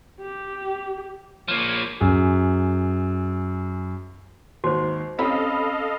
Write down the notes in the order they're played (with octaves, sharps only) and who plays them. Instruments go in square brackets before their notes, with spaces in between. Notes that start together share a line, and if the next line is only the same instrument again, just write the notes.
[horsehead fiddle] G4
[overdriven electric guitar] F3 A#3 [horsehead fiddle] C#5
[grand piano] F#2 G#4
[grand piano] D#2 G#2 [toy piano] F#4 C5
[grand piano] C4 C#4 G4 [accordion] A4 D#5 F5 [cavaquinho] B5